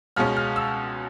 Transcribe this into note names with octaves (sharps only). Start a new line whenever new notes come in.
C#2 B2 G#3 C#4 F6
F6
E6